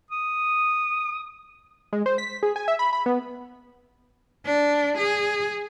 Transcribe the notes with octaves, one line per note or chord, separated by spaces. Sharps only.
D#6
G#3
C5
B6
G#4
G#5
E5
B5
B5
B3
D4
G#4